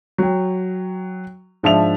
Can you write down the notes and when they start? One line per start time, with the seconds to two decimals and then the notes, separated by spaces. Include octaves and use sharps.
0.18 F#3 G5
1.63 G#2 F3 D4 E5 F7